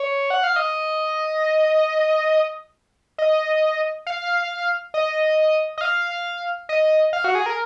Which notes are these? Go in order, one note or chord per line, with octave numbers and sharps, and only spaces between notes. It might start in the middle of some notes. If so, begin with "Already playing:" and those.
Already playing: C#5
F#5
F5
D#5
D#5
F5
D#5
D#5
F5
D#5
F5
F#4
G#4
A#4